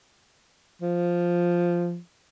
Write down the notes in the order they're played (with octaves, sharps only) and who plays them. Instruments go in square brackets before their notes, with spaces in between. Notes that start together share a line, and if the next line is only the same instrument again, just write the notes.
[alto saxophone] F3